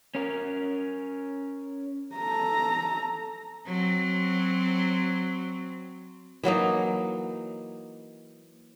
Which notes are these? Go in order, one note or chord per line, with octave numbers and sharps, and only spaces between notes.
C#4 A#4
A4 A#5
F#3 C4
E3 F#3 A#3 D#4